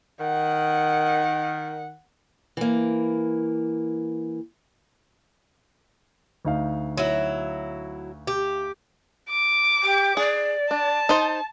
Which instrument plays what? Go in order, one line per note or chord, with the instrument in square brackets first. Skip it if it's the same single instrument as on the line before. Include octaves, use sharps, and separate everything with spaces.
[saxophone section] D#3 [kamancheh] F#5
[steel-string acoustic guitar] E3 A#3
[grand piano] D2 D#4 F5
[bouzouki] F#3 E4
G4
[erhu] D6
[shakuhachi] G4
[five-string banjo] G#4 [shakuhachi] D5
[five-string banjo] D4 [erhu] A5
[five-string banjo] D#4 C5